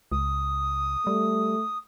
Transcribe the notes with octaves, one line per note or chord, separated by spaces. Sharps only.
C#2 D#6
G3 A3